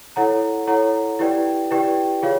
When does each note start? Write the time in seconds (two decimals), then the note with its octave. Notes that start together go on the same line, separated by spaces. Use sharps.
0.16 E4 A4 C#5 F#5 A#5
0.67 E4 A4 C#5 F#5 A#5
1.19 E4 G4 B4 D5 G5
1.71 E4 G4 B4 D5 G5
2.22 F4 G#4 C#5 F5